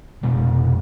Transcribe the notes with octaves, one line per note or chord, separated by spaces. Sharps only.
F1 B2 G#3